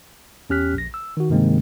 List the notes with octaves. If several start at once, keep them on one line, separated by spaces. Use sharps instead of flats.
E2 C#4 G4 F6 F#6 B6
A#1 A#6
E6
D#3 F#4
G2 C3 D#3 G#3 A#3 C4